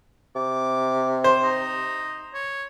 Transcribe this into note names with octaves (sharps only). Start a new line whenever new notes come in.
C3 D6
C5
D#4
C#5